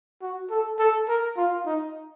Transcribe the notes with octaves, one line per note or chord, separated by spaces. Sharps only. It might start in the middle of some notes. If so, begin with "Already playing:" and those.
F#4
A4
A4
A#4
F4
D#4